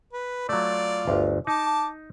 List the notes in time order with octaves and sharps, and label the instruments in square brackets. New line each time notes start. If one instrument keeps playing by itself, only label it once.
[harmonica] B4
[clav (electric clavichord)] F#3 A3 [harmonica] F4 D5
[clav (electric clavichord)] G1 D2
[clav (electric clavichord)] D#4 [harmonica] A5 D6